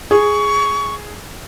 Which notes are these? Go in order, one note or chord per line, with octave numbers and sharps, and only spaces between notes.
G#4 C#6